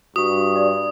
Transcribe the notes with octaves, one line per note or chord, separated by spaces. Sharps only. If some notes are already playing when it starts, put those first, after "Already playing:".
G2 F#4 C#6 D#6
D5